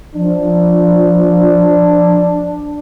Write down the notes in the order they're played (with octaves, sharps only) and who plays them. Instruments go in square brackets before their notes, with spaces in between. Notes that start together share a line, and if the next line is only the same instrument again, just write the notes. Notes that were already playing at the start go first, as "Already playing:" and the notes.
[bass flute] F3 [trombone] D4